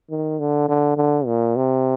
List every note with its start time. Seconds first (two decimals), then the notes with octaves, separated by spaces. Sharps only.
0.10 D#3
0.39 D3
0.68 D3
0.97 D3
1.26 A#2
1.56 C3